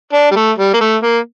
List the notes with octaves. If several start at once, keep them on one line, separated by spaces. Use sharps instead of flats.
D4
G3
A3
G3
A#3
A3
A#3